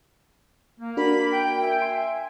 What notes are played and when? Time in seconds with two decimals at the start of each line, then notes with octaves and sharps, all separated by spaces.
0.80 A#3
0.97 D4 F#4 A#4 B5
1.32 G5
1.62 E5 G#5
1.82 C6